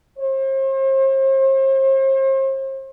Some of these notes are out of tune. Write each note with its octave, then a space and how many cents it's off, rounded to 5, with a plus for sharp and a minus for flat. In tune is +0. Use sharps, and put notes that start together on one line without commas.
C5 +40